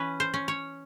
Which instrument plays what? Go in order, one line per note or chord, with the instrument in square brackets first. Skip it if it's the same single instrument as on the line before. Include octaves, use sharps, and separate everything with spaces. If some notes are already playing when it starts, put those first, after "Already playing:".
Already playing: [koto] E3 C#4 B4
C5
C#4
C#5